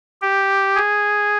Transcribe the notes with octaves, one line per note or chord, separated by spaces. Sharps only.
G4
G#4